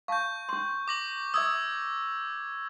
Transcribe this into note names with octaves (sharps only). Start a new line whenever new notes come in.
F5 A5 C#6 G6
C#4 C6
D6 A#6 F#7
E5 D#6 E6 G#6